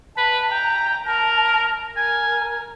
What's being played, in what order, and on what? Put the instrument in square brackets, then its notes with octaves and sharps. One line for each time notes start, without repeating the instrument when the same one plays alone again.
[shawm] B4 [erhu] A5
[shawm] G5 [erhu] A#5
[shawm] A#4 [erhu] A5
[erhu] A#4 [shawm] G#5